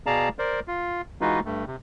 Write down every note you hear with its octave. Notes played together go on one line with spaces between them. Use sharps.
B2 G#4 D5 F5 A5 A#5
A#4 C5 D5
F4
E3 G#3 D#4 F4 F#4 B4
G2 A3
C3